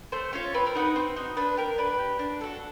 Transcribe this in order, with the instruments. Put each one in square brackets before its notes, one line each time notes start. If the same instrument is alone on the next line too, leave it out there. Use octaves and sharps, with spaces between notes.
[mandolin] A3 C5
C#4 F4 C#5
C4 B4
A#4
D#4 F#4 B4
C4
D#4 F#4
D4 B4
G4 A#4
D4 B4
G4
D4
F#4 A4